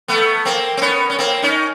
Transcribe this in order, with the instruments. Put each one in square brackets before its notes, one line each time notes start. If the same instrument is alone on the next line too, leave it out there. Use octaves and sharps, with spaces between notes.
[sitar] A3 B3
A#3 C4
C4
B3 C#4
C#4
A#3 C4
C#4 D#4